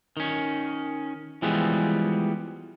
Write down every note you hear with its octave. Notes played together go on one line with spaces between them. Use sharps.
D#3 C#4
E3 F3 G3 G#3 B3